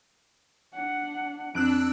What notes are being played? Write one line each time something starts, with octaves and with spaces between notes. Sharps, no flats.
D4 F#5
F2 D4 E6 F#6 D7